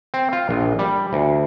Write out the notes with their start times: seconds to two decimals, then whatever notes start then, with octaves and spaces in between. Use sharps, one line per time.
0.14 C4
0.33 F4
0.49 A#1
0.79 G3
1.13 D2